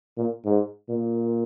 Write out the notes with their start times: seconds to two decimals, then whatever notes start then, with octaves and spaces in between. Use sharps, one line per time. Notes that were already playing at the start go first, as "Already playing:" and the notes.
0.17 A#2
0.45 G#2
0.89 A#2